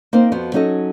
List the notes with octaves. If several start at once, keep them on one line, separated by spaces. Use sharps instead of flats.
A#3 C4 D#4 A#4 C5
F2 F3 B3 F#4
F#3 C#4 D#4 A4 D#5